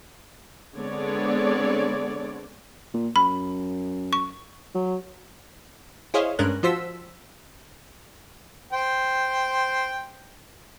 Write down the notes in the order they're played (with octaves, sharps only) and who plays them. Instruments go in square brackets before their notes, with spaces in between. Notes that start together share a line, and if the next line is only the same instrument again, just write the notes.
[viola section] D3 G#3 B3 C4 C#5 D5
[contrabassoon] A#2
[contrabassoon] F#2 [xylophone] B5
[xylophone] C#6
[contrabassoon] F#3
[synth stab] E4 G#4 C5 C#5 D#5 F5
G2 G#3 C#4 D4 A#4 F#6
F3 F4 F#4 C5 E6 B6
[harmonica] C5 G5